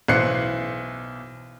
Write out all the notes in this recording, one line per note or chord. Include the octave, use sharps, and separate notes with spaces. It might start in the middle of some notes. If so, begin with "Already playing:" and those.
B1 E3 C5 F#6 C7 C#7